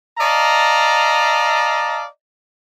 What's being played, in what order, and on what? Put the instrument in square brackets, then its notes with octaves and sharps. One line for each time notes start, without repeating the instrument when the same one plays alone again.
[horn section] D5 D#5 F5 A5 A#5